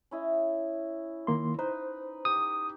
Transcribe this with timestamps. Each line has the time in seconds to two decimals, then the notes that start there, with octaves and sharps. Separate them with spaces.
0.11 C#4 E4 D#5
1.27 D#3 A#3 C6
1.59 D#4 B4 C5
2.25 G4 D#6